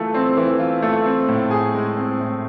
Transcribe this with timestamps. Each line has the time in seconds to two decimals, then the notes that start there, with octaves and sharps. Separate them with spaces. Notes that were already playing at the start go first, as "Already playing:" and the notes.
Already playing: E3 A3 F4
0.14 C4
0.37 E3
0.60 F4
0.82 A3
1.05 C4
1.28 A2
1.51 G#4
1.74 G#3
1.96 C4
2.20 A2